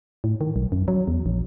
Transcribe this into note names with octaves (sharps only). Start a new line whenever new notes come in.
A2
D#3
B1
F#2
F#3
E2
A#1